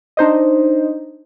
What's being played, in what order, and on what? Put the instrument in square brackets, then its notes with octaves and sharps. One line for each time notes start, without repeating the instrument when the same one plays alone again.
[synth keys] D4 D#4 C5 D#5